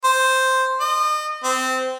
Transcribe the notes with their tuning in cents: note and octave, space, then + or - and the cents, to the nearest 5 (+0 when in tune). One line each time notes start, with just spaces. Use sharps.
C5 +0
D#5 -35
C4 -20